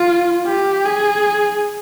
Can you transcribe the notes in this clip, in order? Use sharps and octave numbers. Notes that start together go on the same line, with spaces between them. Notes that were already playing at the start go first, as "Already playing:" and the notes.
Already playing: F4
G4
G#4